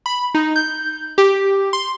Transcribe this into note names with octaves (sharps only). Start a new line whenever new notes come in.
B5
D#4
G6
G4
C6